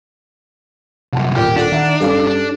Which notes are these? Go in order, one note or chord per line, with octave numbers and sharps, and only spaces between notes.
C2 F#2 F#5 A5
D#1 A#2 G4 F6
D4 A4 F#5
D#3 E5 F#5 A#5
G2 C#4 G4 A4 F5 D6
D4